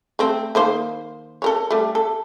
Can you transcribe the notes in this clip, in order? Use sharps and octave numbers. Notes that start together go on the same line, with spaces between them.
A3 C4
D#3 A#3 C5
A4 A#4 C#5
G3 A3
A4